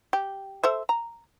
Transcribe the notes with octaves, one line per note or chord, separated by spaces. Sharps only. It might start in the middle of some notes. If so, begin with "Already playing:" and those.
G4
A4 C5 E5
A#5